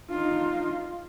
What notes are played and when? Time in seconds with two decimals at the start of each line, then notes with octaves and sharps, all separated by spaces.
0.11 D#4 F4